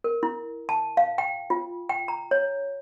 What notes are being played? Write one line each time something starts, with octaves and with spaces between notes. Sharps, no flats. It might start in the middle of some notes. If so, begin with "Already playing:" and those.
A#4
E4
A5
F5
G5
F4
G5
A#5
C#5